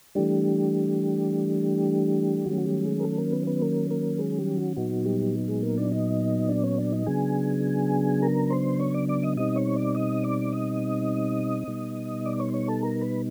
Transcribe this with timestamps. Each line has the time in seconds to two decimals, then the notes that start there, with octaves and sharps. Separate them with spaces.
0.15 E3 G3 A3 D4 G4
2.46 D#3 F#3 A3 C#4 F#4
2.57 F#4
2.65 G3 G4
2.85 G#3 G#4
3.00 A#4
3.03 A3 A4
3.18 A#3 A#4
3.32 B3 B4
3.47 B3 B4
3.61 A#3 A#4
3.90 A#3 A#4
4.18 G#3 G#4
4.38 G3 G4
4.57 F#4
4.77 A#2 F#3 B3 D#4 F#4
5.05 G3 G4
5.48 G#3 G#4
5.63 A#3 A#4
5.77 D4 D5
5.92 D#4 D#5
6.49 D4 D5
6.64 C#4 C#5
6.78 D4 D5
6.92 D#4 D#5
7.06 C#3 F#3 B3 D4 G#4 G#5
8.22 A#4 A#5
8.50 C5 C6
8.79 C#5 C#6
8.94 D5 D6
9.09 D5 D6
9.23 D#5 D#6
9.37 B2 G3 C4 D#4 D#5 D#6
9.56 C#5 C#6
9.76 D5 D6
9.95 D#5 D#6
10.23 D5 D6
10.52 D#5 D#6
11.67 B2 G3 B3 D#4
12.26 D5 D6
12.40 C#5 C#6
12.49 C6
12.54 C#5 C#6
12.68 A4 A5
12.83 A#4 A#5
13.01 B4 B5